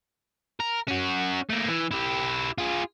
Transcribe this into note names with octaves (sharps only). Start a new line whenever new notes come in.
A#4
C#4 F#4
A3 A#3
E3
E4 G4
F4 G#4